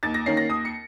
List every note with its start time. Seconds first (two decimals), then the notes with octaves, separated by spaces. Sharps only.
0.03 D#2 A6
0.14 A#6
0.26 D#3 A#3 C#4 C7
0.37 A#6
0.49 D#2 D#6
0.65 C#7